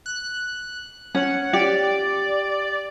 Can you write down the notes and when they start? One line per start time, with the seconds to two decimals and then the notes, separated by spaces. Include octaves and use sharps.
0.06 F#6
1.15 C#4 F#5
1.53 G4 D5